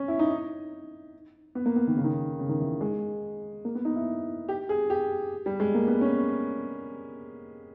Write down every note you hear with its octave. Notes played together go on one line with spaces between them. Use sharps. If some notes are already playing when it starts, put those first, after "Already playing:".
Already playing: C#4
E4
D#4
B3
A#3
B3
D#3
C#3
D#3
C#3
D#3
E3
G#3
A#3
B3
D#4
E4
G4
G#4
G4
G3
G#3
A#3
B3
C#4